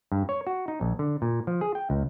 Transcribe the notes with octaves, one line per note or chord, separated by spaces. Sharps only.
G2
C#5
F#4
D#4
A#1
D3
A#2
F3
G#4
G5
C#2